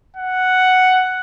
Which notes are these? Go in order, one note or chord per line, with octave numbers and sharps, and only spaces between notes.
F#5